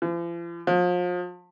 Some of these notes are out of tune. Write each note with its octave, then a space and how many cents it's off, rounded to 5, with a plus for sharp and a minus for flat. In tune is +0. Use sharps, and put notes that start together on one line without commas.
F3 -45
F3 +35